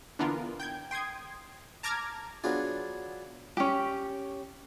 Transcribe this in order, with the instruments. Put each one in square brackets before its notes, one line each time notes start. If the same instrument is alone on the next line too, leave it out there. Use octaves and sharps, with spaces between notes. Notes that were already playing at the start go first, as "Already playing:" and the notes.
[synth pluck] D3 E3 B3 F4 A#4
G5 G6 G#6
G5 C6 D#6 G#6
A5 A#5 D6 F6 G#6 A#6
[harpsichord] F#3 B3 D4 F4 G#4
[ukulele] C#4 G4